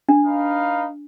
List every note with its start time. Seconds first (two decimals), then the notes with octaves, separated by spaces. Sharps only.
0.09 D4
0.24 D#4 B4 F5